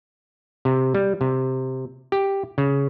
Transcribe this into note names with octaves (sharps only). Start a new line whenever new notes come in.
C3
G3
C3
G4
C#3